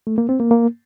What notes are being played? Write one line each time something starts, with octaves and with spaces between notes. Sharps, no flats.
A3
A#3
C4
A#3
A#3